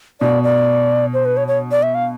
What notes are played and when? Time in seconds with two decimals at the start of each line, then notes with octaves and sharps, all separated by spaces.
0.21 B2 D5
0.43 D5
1.14 C5
1.25 B4
1.37 C#5
1.48 C#5
1.71 D5
1.83 E5
1.95 F5